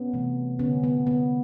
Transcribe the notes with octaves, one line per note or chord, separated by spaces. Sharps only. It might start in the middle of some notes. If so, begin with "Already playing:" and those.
Already playing: B3 C#4
C3 E3 A3
D3 G3 A#3 B3 C#4
B3
D3 G3 A#3 B3